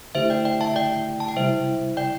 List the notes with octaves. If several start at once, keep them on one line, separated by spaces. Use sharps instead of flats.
D3 A3 E4 G4 C5 E5
D5 G5
D5 G5
E5 A5
D5 G5
A5
G5
C3 G3 E4 C5 E5
D5 G5